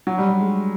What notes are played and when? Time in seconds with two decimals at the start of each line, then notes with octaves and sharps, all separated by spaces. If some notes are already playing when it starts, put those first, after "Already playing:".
0.07 F#3
0.18 G3
0.29 G3
0.40 G#3